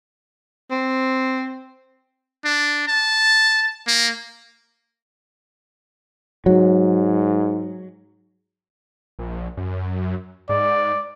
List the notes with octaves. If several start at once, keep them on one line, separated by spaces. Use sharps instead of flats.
C4
D4
A5
A#3
G#2 F#3
A#1
F#2
G#2 D5